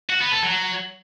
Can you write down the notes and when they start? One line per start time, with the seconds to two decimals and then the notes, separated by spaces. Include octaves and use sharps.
0.10 F#4
0.21 B3
0.32 A4
0.44 F#3